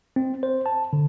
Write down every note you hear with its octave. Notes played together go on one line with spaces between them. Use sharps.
C4
C5
A5
D3